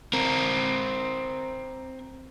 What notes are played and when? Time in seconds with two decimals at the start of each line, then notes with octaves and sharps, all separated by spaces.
0.13 C4 A#4